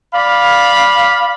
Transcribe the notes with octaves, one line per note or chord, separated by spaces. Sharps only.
D5 F5 B5